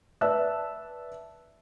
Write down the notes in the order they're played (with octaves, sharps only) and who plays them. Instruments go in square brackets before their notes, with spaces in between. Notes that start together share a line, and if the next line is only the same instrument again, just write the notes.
[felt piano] B4 D5 E5 A5 E6 F#6